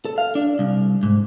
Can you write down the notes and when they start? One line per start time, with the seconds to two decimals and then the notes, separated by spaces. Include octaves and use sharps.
0.05 A4
0.18 F5
0.35 D4
0.59 C2
1.03 G#2